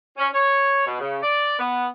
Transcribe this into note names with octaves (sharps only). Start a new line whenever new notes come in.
C#4
C#5
B2
C#3
D5
B3